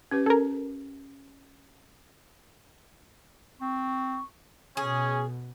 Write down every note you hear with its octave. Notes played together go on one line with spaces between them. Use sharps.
C#4 G4 B4
C#4 A4 A#4
C4 C#6
B2 C#4 G#4